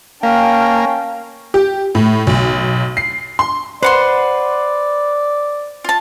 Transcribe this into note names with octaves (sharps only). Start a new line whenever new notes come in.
A#3 C#4 F5 G5 A5
G4
A2
B1
C7
C6
B4 C5 D5 F#5 C6
F4 A5